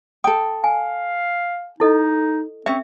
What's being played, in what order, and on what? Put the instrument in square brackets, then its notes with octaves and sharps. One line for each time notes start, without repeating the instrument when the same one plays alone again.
[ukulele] A4 G5 [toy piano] D#6
[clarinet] F5 [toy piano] G#5
[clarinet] D#4 [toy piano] E4 A4 D#5
[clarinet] C4 [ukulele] C#4 C#5 [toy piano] E5